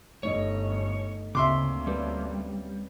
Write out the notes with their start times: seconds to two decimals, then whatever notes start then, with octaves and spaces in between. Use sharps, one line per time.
0.23 G1 A3 D#4 C#5 D#5
1.35 D2 C#3 A#3 C4 E5 C6 D6
1.87 G3 C#4 B4